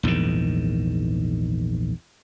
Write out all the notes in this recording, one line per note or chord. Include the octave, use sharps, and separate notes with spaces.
A#1 E2 G#2 D#3